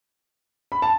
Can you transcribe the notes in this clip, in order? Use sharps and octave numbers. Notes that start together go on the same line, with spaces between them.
B5
A5